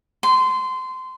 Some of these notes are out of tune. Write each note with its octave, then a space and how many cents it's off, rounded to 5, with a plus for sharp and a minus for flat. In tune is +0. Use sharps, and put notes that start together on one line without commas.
C6 -20